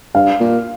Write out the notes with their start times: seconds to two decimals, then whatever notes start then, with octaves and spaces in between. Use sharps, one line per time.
0.14 G2 F5
0.40 A#2